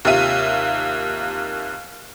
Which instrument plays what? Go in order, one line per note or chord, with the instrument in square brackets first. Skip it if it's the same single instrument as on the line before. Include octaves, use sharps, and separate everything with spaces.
[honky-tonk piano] D#2 C3 F4 E5 D#7